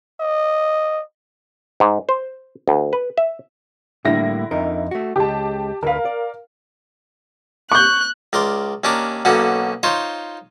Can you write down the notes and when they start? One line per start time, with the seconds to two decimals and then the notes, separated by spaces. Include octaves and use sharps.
0.21 D#5
1.80 G#2
2.09 C5
2.68 D2
2.93 B4
3.18 E5
4.05 A2 D3 G3 A#3 E4 A#6
4.51 F2 D#4 A#4
4.91 A3 F#4
5.16 C#2 G#3 G4 A5
5.83 D2 A#4 B4 F5
6.05 D5
7.72 C#6 F#6 G6
8.33 C#2 A#4 D5 C6
8.84 D#2 C#4 D4 A#4 D6
9.25 B1 D3 A#3 C#4 F#4
9.83 D#4 F4 C5 C#5